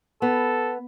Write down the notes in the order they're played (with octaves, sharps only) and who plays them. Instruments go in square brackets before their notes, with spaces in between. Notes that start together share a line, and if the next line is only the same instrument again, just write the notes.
[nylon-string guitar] B3 [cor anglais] A4